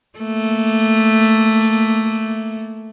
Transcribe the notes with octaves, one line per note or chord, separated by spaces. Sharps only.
A3 A#3